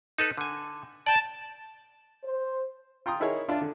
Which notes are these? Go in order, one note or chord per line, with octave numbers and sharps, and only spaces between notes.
D#4 A4 B4
D3 G#5
D5 G5 A5
C5
F4 G5 A#5 C6 D#6
D#4 E4 G#4 A#4 C#5
D4 F4 D5 E5
D3